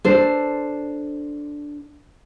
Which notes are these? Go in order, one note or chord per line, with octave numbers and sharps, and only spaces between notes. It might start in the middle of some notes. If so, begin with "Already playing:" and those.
D4 A4 C5